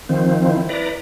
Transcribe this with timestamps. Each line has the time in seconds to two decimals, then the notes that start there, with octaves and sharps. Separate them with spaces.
0.09 D#3 F3 C4
0.46 E4
0.69 B4 D5 A#5